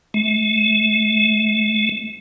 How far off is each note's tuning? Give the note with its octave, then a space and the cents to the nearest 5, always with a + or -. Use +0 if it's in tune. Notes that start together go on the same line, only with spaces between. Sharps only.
A3 -35